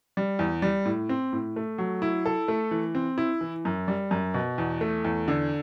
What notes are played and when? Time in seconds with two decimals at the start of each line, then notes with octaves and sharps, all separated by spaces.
0.17 G3
0.39 E2
0.62 G3
0.86 A2
1.09 C4
1.33 A2
1.56 A3
1.78 F#3
2.02 E4
2.26 A4
2.48 A3
2.71 E3
2.95 C4
3.18 E4
3.41 E3
3.65 F#2
3.88 G3
4.11 F#2
4.34 B2
4.58 E2
4.81 A3
5.05 E2
5.28 D3